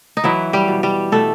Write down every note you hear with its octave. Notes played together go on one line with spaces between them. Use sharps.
D#4
E3 F#3 E4
G3 G4
B2
G3 G4
B2 A3 A4